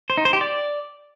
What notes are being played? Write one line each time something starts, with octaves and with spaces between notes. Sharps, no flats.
C5
D#4
C5
G4
D5